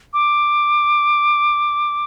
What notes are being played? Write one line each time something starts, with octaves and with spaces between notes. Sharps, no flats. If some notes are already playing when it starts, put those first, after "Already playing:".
D6